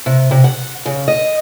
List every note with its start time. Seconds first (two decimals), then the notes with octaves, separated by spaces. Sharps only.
0.06 C3
0.31 C3
0.44 F#5
0.86 C#3
1.08 D#5